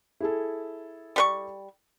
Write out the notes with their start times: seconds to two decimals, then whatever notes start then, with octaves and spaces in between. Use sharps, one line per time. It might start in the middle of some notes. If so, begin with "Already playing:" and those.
0.20 E4 G#4 A4
1.16 G3 B4 C#6